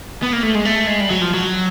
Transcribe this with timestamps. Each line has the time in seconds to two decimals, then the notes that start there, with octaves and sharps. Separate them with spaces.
0.23 B3
0.33 A#3
0.43 A3
0.55 G#3
0.65 A3
0.88 G#3
1.01 G3
1.10 F#3
1.22 F3
1.34 F#3